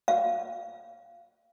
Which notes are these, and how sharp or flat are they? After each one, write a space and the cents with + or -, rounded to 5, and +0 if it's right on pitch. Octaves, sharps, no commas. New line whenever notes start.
F5 -25